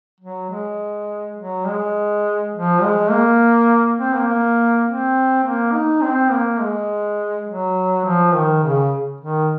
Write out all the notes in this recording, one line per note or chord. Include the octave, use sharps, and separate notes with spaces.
F#3
G#3
F#3
G#3
F3
G#3
A#3
C4
A#3
A#3
C4
A#3
D#4
C4
A#3
G#3
F#3
F3
D#3
C#3
D#3